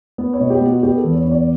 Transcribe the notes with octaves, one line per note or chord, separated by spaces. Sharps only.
B3
C#5
B2
G4
B3
F#4
B3 G4
A4
E2
C#5
B3
D5